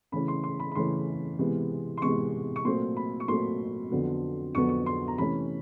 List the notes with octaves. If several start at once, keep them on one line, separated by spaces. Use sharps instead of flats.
C#3 E3 A3 C#4 B5
C6
C6
B5
B5
C#3 E3 A3 C#4 C6
C3 E3 G#3 B3
C6
C3 E3 G#3 B3 C#6
C#6
A#2 F#3 A3 C4 C6
B5
C#6
A#2 F#3 A3 C4 C6
F2 D3 F#3 B3
F2 D3 F#3 B3 C#6
C#6
C6
A#5
C3 E3 A3 C#4 B5